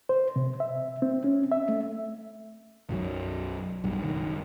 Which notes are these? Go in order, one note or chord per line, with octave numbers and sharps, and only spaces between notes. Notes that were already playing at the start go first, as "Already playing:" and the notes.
C5
C3
E5
C4
C#4
E5
A3
B1 F#2 F3 F#3
B1 G2
F#1 D#3